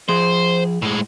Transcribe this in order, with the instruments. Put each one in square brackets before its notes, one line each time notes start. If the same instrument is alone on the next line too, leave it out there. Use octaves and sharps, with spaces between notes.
[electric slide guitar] F3 G#4 [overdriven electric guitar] C5
[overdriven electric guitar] A2 G#3